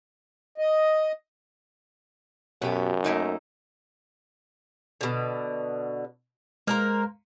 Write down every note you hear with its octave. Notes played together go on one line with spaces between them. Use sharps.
D#5
F#2 B2 G4
A3 A#3 D#4
B2 D3
G#3 A#3 A#4 C5 F6